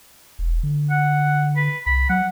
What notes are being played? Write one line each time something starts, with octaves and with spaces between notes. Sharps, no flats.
E1
D3
F#5
B4
C2 B5
F#3 F#5